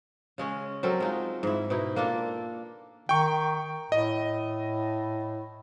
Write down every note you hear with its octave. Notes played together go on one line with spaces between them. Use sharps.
C#3 G#3 C#4
F#3 C4 A4 A#4
G#3 D#4 F4
G#2 E4
B2 D#4 E4
A#3 D4 F4 A4
D#3 G5 C#6
A2 D#5